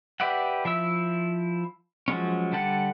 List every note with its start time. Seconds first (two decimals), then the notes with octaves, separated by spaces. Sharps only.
0.20 G4 B4 D5 E5 F#5
0.65 F3 E4 E5 E6
2.08 F3 F#3 G#3 C#4
2.52 D3 G3 A4 F#5 F#6